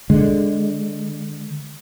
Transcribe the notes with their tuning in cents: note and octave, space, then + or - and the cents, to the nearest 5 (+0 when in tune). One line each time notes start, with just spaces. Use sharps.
D3 -5 G#3 +0